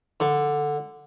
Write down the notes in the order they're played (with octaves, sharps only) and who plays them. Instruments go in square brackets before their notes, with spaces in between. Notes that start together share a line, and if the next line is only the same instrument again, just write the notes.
[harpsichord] D3